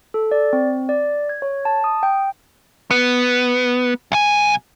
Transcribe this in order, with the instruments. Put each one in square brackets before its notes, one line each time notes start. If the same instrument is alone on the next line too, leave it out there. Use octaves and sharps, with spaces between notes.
[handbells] A4
D5
C4
D5
G#6
C#5
A5
D#6
G5
[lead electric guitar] B3
B1 G#5